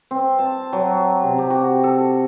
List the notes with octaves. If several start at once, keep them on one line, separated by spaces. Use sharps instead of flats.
C4
A5
F#3
C3
G4
F#4
A4